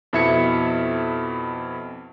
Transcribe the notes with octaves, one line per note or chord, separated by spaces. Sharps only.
F2 B2 E4 E5 G#6 C#7